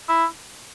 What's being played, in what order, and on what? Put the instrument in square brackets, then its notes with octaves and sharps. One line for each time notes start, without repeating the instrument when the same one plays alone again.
[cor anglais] E4